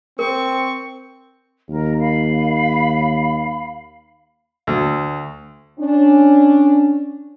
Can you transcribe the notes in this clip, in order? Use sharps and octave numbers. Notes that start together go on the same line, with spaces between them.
C4 A#4 C#6
D#2 A#4
F5 B5
D2
C#4 D4